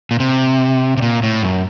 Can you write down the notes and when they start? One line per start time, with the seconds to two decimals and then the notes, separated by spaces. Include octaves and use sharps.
0.11 A#2
0.20 C3
0.97 C3
1.02 A#2
1.23 A2
1.43 F#2